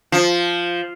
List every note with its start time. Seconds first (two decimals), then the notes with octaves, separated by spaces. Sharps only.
0.12 F3